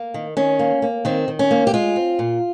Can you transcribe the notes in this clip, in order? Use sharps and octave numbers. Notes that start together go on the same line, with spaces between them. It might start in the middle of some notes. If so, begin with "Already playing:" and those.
Already playing: A#3
D#3
D#3 C#4
A#3
A#3
D#3 C4
D#3
C#4
A#3
G4
G#3 F4
C4
A#2